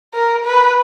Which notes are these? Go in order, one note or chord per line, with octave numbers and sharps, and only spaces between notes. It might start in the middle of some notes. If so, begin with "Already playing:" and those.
A#4
B4